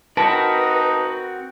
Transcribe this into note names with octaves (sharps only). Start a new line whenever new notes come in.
C4 D#4 F#4 A#4 B4 A5